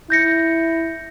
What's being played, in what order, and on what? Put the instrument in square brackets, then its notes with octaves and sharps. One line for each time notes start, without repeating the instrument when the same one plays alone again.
[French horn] E4 [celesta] G6 A#6 C#7